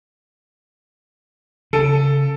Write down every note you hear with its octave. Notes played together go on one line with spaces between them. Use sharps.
C#3 A4